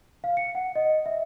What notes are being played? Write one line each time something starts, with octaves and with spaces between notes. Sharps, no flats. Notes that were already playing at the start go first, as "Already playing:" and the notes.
F5
C#7
F#5
D#5
E5